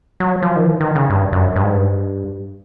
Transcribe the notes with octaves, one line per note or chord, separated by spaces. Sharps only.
F#3
F3
D#3
E3
D#3
C#3
G2
F#2
G2
G#2
G2